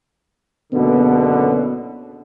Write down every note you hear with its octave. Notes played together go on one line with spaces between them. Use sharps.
F#1 B2 D3 B3